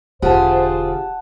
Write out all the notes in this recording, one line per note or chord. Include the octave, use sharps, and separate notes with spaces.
E1 D3 F4 G4 G#4 C5 F#5 A5